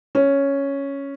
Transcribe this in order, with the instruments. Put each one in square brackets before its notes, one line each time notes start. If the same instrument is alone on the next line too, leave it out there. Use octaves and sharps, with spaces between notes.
[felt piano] C#4